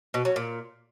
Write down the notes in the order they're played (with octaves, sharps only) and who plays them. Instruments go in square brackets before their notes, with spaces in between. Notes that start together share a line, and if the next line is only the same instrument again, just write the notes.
[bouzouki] B2
F#3
A#2